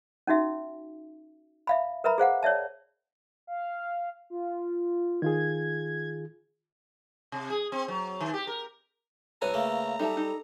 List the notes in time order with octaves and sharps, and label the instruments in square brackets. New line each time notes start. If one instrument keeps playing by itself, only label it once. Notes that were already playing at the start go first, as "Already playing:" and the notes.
[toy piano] C#4 D#4 F#4 E5
E5 F5 B5
A#4 B4 E5 A#5 B5
G#4 C5 F5 F#5
C#5 D5 E5 A5
[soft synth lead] F5
F4
[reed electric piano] D#3 F4 G#4 [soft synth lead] G#6
[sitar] C3
G#4
C4
F#3
D#3
G4
A#4
[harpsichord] C2 G#5 [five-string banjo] A4 B4 C#5 [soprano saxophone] A#5
[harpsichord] C#3 A3 A#3
[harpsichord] G3 [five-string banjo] D#4 E5 A5 [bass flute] A4
[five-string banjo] D#4